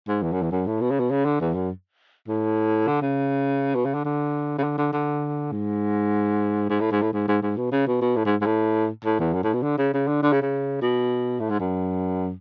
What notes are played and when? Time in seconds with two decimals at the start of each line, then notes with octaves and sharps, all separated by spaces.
0.08 G#2
0.22 E2
0.32 F#2
0.42 E2
0.51 F#2
0.67 A2
0.81 B2
0.91 C#3
1.00 B2
1.11 C#3
1.25 D3
1.40 E2
1.55 F#2
2.28 A2
2.87 D3
3.02 C#3
3.75 B2
3.85 C#3
3.94 D3
4.05 D3
4.58 C#3
4.63 D3
4.78 D3
4.92 D3
5.52 G#2
6.70 G#2
6.80 A2
6.91 G#2
7.02 A2
7.13 G#2
7.28 G#2
7.42 G#2
7.57 B2
7.72 C#3
7.87 B2
8.02 B2
8.17 A2
8.26 G#2
8.41 G#2
8.46 A2
9.05 A2
9.19 E2
9.34 F#2
9.43 A2
9.54 B2
9.63 D3
9.78 C#3
9.93 C#3
10.08 D3
10.23 D3
10.32 C#3
10.42 C#3
10.82 B2
11.40 A2
11.50 G#2
11.60 F#2